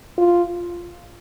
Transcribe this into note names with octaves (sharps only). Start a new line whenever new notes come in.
F4